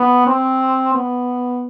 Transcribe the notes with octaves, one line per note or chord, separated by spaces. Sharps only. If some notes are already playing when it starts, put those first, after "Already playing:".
Already playing: B3
C4
B3